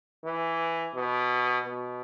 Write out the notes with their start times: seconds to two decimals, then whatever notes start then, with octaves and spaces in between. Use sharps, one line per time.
0.25 E3
0.95 B2
1.66 B2